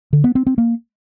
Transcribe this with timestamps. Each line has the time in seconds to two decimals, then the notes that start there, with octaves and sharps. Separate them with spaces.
0.13 D3
0.24 B3
0.35 C4
0.47 C4
0.58 A#3